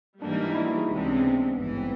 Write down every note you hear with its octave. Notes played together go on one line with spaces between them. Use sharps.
G#2 E3 G3 A#3 D4
D#4
E4
D#4
E4
F#4
G#4
C#2 C3 E3 G#3
D4
C#4
C4
B3
G#1 G2 E3 B3
C4